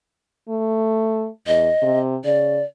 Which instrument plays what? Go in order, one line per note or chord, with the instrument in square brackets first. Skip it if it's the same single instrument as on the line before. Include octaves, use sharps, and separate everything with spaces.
[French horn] A3
[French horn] E2 [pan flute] D#5
[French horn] C3
[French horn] C#3 [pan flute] D5